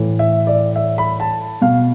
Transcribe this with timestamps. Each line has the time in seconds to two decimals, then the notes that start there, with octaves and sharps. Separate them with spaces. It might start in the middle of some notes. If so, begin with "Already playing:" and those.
Already playing: A2 E3
0.19 E5
0.47 D5
0.76 E5
0.98 B5
1.20 A5
1.62 B2 F5